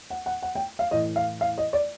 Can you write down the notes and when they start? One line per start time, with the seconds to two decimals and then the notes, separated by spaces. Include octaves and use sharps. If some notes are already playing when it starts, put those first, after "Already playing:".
0.10 F#5
0.26 F#5
0.42 F#5
0.55 G5
0.79 F5
0.91 A2 E3 D#5
1.16 F5
1.41 F5
1.58 D#5
1.73 D5